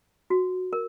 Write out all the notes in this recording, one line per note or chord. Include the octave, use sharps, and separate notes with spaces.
F#4
A#4